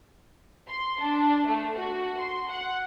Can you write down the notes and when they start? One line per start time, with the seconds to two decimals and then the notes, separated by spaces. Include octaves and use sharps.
0.68 C6
1.00 D4
1.46 A3
1.77 F#4
2.19 C6
2.49 F#5